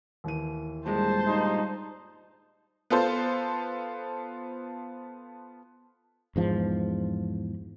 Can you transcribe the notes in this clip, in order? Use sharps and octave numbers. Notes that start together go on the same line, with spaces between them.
D#2 E3 D#7
G2 A#2 G#3 C5 A5
G3 D#4 F4
B3 F4 A4 C5
E2 G#2 F3